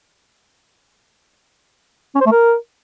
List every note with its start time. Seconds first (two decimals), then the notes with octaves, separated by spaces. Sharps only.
2.15 C#4
2.21 C5
2.26 A3
2.32 A#4